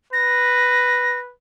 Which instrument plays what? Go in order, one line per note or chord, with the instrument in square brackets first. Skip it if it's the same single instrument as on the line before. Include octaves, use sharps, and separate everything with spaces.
[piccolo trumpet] B4 [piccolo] A#6